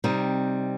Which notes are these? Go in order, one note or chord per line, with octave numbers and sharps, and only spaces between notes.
C3 G3 C4 D#4